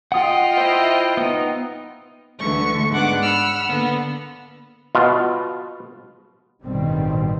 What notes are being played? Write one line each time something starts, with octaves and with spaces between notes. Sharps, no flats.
F4 D#5 F#5 G5 D#6
E4 C5 E5
B3 D#4
D2 D3 E3 C#6
G#2 B3 D4 F#5 D6 F#6
F#5 B5 E6 F6
D3 A#3 B3
B2 F4
A1 G2 B2 D#3 G3 C4